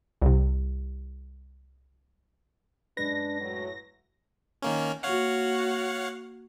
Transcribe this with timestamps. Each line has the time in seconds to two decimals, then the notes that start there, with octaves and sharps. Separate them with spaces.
0.22 C2 C3
2.97 F#2 G#3 D4 B4 A#6
3.40 A2 F#3
4.62 D#3 A#3 C#4
5.03 A#3 F#4 C#5 F5 F#5